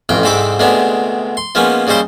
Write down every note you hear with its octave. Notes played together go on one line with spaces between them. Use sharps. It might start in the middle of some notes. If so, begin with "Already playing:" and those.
A1 F2 C3 G5
C2 G#2 C4 A4 B5 D6
D2 C3 G#3 B3 D4
C6
F3 G#3 A#3 B3 C#4
D#2 C#3 G3 D#4 C5 C6